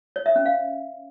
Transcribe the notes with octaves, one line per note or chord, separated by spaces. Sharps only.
C#5
E5
C#4
F5